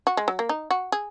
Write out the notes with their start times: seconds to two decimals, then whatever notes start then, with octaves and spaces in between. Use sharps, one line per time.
0.07 F#4
0.17 G#3
0.28 F#3
0.39 A#3
0.49 D#4
0.71 F#4
0.92 G#4